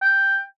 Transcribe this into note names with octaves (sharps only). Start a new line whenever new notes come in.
G5